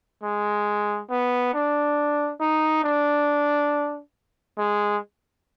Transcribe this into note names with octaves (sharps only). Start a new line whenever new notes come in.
G#3
B3
D4
D#4
D4
G#3